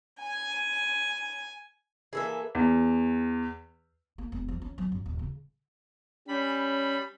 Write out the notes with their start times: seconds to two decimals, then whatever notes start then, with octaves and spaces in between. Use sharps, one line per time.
0.22 G#5
2.13 E3 A#3 G#4 A4 E5
2.55 E2
4.18 A#3
4.32 E1
4.48 F3
4.62 C#4
4.78 F#3
4.92 F#2
5.06 D#1
5.19 C#3
6.28 G3 C#4 B5